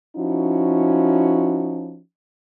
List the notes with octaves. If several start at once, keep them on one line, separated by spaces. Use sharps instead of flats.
F3 C#4 D#4 E4 F#4